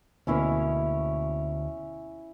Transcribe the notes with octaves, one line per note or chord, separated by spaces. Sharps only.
D2 B2 A#3 C#4 E4 C#5